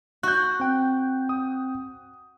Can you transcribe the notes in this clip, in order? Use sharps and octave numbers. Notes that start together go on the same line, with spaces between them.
F#4 F#6 G6
C4 G5
D#6